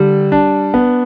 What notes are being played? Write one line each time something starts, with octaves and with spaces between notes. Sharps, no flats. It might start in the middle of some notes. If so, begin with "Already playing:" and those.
Already playing: D3 G3
D4
B3